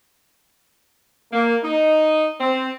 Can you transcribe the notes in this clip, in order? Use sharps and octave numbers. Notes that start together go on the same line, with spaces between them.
A#3
D#4
C4